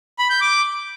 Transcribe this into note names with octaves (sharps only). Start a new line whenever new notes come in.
B5
G6
D6